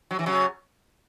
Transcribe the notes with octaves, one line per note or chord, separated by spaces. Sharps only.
F#3
E3
C#3 F#3